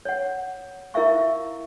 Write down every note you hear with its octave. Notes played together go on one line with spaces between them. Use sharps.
C#5 F#5
E4 A#4 E5 F5 C#6